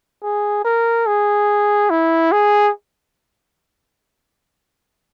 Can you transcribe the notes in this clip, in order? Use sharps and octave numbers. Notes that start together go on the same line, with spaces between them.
G#4
A#4
G#4
E4
G#4